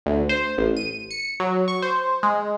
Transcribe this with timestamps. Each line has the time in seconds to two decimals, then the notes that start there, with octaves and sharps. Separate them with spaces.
0.06 D2
0.29 C5
0.57 A1
0.77 D#7
1.11 C#7
1.40 F#3
1.68 C#6
1.82 C5
2.23 G#3